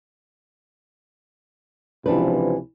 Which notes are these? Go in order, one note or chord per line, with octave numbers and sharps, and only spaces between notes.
C#2 C3 E3 F3 D4 B4